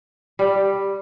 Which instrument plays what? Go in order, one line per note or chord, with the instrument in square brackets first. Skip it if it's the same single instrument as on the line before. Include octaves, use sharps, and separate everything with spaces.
[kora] G3